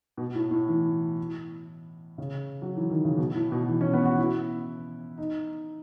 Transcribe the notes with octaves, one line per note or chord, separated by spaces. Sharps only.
B2
A2
A2
E3
C#3
F#3
E3
D#3
C#3
B2
A2
B2
E3
C#4
B3
F#4
E4
D#4